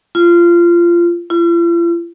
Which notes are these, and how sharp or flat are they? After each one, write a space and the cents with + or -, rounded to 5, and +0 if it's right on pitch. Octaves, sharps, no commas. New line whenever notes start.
F4 -20
F4 -45